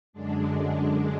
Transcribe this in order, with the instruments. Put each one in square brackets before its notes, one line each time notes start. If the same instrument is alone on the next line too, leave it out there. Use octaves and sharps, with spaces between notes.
[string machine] F#2 D3 G#3 D4